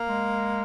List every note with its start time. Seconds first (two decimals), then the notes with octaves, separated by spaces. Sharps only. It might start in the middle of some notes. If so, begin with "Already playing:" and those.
Already playing: A#3
0.09 G#3